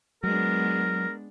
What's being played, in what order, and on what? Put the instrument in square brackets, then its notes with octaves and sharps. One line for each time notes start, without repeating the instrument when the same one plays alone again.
[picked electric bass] F#3 [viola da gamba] G#3 B3 D4 [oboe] A#4